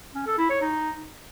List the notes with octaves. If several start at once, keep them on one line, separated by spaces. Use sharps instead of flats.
C#4
A4
E4
C#5
D#4